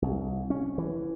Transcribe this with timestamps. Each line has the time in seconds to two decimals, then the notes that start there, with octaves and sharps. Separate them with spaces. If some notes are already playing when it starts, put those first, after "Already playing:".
0.02 C2
0.50 C#4
0.78 E3